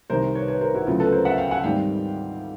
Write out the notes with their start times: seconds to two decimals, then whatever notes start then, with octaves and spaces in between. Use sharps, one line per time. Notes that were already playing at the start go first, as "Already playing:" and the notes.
0.10 C2 C3 D#3 A#4 C5
0.35 B4 C#5
0.48 B4 C#5
0.61 A#4 C5
0.74 E4 F#4
0.86 D2 C#3 F#3 B3 F4
1.00 A4 B4
1.12 A#4 C5
1.25 E5 F#5
1.38 F5 G5
1.51 F#5 G#5
1.64 G#2 D#3 G3 C4 F5 G5